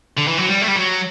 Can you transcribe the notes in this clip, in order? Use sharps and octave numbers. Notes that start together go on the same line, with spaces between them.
D3
E3
F#3
G3
A3
G3
F#3